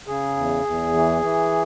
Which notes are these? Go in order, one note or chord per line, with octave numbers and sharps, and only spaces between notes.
C#3 G#4
E2
E2
E3
E3